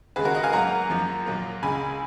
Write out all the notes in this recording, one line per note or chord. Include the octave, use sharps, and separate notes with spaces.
D#2 C#3 G#3 G#4 B4
F#4 A#4
D#5 F#5
F5 G#5
G#2 F#3 A#3 F#5 A#5
F#2 F3 A#3
A#2 F#3 A#3
C#2 C#3 G#3 G#5 B5